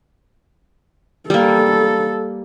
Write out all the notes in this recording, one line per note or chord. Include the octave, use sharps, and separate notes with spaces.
G3 A#3 A4